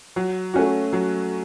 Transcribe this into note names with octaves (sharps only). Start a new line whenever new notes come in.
F#3
A3 C#4 F#4
F#3